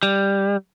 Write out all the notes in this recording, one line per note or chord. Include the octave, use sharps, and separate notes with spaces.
G3